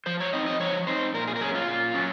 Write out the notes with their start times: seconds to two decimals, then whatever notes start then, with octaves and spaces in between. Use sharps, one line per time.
0.06 F3 C5
0.20 C#5
0.33 C4 D#4 D#5
0.46 D#5
0.60 F3 C#5
0.87 C4 D#4 C5
1.14 A#2 A#4
1.28 G#4
1.36 A#4
1.40 F#3 C#4 G#4
1.55 F4
1.68 A#2
1.94 F#3 C#4